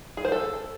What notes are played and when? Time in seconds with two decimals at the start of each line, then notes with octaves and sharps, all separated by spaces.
0.17 G#4
0.25 C5
0.32 A4